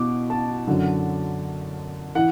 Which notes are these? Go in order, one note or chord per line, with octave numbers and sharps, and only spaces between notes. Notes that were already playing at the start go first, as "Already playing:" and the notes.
Already playing: B2 D6
A5
F#2 D3 F#3
E3 F#5